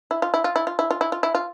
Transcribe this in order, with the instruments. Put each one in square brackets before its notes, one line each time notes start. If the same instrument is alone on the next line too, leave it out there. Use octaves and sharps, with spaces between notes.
[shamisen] E4
F4
E4
F4
E4
F4
E4
F4
E4
F4
E4
F4